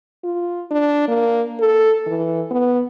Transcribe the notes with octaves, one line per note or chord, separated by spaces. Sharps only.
F4
D4
A#3
A4
E3
B3